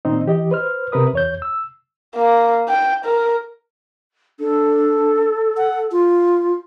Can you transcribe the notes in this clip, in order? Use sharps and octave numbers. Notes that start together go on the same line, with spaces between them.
A#2 D#3 C4 D#4
E3 G4 D#5
B4 C5 F6
C3 A#4 B4 D#6
E2 C#5 G6
E6
A#3
G5
A#4
D4 A4
F#5
F4